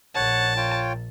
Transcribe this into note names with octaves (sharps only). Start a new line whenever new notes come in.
A#1 C#5 F#5 A5
F4 C#5 G5